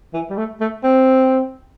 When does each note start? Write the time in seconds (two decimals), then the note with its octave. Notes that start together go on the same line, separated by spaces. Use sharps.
0.13 E3
0.30 G3
0.37 A3
0.60 A3
0.83 C4